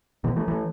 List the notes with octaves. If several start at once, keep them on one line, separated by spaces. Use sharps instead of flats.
B2 E3
E3 A3
E3 A3